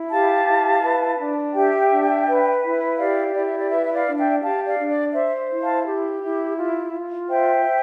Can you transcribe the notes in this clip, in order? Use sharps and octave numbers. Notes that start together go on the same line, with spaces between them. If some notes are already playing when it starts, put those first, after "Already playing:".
Already playing: E4
G4 F5 A5
E4
B4
D4
G4 E5 G5
D4
B4
E4
G4 D5 F5
E4 D5
E5
D5
B4 E5
E5
D5 F5
D4
E5 G5
G4 F5 A5
D5 F5
D4
D5
C5 E5
E4
F5 A5
G4
E4
F4
F4
C5 E5 G5
C5